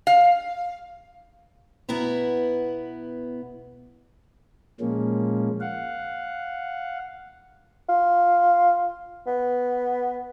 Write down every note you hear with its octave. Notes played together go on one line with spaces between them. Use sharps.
F5
B2 B3 E4 E5 A#5
A#2 F3 G#3 A#3 C#4
F5 F#5
F4
B3